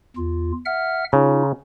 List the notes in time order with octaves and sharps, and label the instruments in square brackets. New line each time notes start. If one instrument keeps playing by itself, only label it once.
[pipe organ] E2 F4
E5 F#5 F6
[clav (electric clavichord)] C#3 [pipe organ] D#4 F4